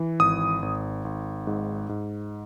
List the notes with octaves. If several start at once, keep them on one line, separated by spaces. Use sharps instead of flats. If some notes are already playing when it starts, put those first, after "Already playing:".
Already playing: E3
G#1 D#6
G#1
G#1
G#2
G#2